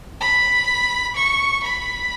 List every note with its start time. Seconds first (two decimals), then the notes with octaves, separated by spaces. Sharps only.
0.21 B5
1.16 C#6
1.63 B5